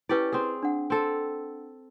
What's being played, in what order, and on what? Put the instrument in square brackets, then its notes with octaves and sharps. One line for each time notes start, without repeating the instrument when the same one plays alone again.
[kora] C#4 G4 D5 [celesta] E4 B4
[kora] C4 G#4
[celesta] D4 F#5
[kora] C4 A4